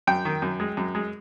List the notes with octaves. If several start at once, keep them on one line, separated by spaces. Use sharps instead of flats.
F#2 G5
D#3
F#2
G#3
F#2
G#3